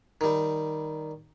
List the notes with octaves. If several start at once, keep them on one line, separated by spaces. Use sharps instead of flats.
D#3 G3